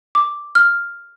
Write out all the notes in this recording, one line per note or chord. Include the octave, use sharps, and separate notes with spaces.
D6
F6